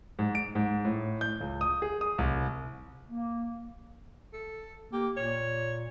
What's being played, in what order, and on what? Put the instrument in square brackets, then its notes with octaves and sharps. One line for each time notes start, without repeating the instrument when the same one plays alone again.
[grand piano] G#2
D7
G#2
A2
G6
C#2
D#6
G#4
D#6
C2
[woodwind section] A#3
[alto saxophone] A4
[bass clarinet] A#3 [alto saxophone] G4
[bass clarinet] A#2 [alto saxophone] C#5